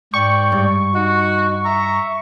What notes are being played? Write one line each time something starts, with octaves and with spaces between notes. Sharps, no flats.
G#2 D5 G5 C#6
G2
D#4 F#4
E5 A#5